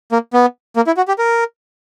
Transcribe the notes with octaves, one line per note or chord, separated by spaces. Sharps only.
A#3
B3
A#3
E4
F#4
G4
A#4